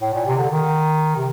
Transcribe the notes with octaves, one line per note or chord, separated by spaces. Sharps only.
A2
A#2
C3
D3
D#3
C3